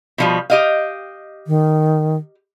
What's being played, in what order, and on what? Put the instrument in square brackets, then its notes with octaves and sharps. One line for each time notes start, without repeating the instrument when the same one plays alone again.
[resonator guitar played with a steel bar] B2 F3 G3
G4 D#5 F5
[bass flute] D#3